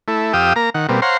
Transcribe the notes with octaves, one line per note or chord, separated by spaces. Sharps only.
A3 E4
F2 G4 F5 G5 D#6 E6
A#3 A#5
D#3 F#5
B2 G3 A#3 C4
C5 C#5 F5 F#5 A#5 C6